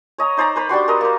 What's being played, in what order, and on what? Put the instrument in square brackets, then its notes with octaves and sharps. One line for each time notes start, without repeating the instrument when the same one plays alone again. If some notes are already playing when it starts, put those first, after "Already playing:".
[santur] C#5 D#5 A#5
D#4 C5 D5 A#5
B4 C5 B5
G3 D4 F#4 C6
A#4 B4 D#5
A#3 C5